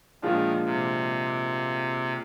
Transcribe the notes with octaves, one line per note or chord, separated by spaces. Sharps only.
A#2 D#3 F3 G#3 D4 F4
C3